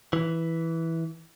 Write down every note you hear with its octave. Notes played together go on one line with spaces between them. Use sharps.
E3